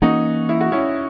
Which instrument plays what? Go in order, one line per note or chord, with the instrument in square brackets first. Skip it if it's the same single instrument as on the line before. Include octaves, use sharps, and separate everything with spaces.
[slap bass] E3 A#3 C#4 [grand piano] D#4 F#4
[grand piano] E4
F#4
C#4 E4